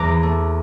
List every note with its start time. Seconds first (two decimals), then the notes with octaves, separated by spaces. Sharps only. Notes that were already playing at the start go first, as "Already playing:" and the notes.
Already playing: E2 A#5 D6
0.08 E3
0.23 A3